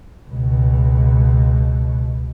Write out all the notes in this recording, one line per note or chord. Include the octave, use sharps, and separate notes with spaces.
C#2 B2